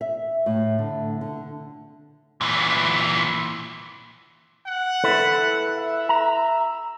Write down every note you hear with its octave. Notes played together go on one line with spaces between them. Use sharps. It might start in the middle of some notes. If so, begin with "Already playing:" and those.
E5
A2
D3
D3
A#2 E3
F#5
E4 A4 B4
E5
A#5